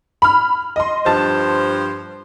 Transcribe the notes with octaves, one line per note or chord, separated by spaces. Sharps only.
B5 F6
D#5 C6
G2 F3 C5 A5